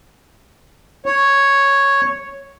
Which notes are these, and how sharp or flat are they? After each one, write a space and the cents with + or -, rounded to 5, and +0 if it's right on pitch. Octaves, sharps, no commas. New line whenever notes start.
C#5 -5